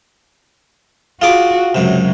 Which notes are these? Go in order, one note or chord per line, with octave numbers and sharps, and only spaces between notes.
F4 F#4 G#4 D6
C#2 F#2 C3 F#3